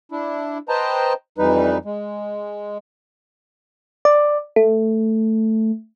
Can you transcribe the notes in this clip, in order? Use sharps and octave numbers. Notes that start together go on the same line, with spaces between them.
D4 E4
B4 C5 D#5 G5 A5 A#5
F2 E3 G3 D#4 B4
G#3
D5
A3